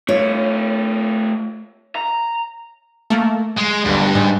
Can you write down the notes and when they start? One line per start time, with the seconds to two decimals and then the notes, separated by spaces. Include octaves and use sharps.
0.08 A3 F4 C#5
1.95 A#5
3.10 A3 A#3
3.58 G#3
3.85 G1 D2 G2
4.15 G#2